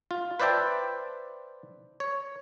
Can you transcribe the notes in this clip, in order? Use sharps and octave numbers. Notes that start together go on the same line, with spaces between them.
F4
B4 C5 D5 E5 G5 A5
C#5